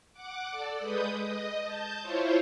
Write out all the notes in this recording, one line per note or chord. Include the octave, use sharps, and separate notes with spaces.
F#5 D6
A4 D5
G#3 B4 D#6 G6
D#5
A5 G6
E4 F4 C5 C#5